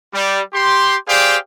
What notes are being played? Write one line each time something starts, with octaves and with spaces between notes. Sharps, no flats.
G3
G4 C6
G4 G#4 C5 D5 F5 G5